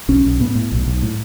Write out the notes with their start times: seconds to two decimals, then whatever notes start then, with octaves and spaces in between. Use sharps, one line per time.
0.08 B1 C#4
0.25 B1
0.40 A2 B3
0.55 A2
0.72 B1
0.86 B1
1.03 A2